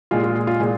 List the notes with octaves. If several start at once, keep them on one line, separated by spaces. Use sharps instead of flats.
A#2 G#3 F4
F4
G#4
F4
A#2 G#3 G#4